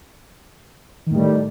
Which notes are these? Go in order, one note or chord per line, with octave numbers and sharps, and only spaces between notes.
A2 D#3 G3